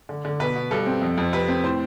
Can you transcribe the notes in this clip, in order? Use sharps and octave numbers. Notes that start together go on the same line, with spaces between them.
D3
D3
B2 B4
B2
G2 A4
C4
F2
F2
C3 B4
C4
A2 C5